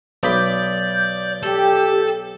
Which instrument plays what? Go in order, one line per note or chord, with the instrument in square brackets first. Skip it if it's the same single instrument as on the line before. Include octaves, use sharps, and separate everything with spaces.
[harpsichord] B1 B5 D6 [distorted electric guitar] D5 [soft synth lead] G6
[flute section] G4 [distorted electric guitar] A4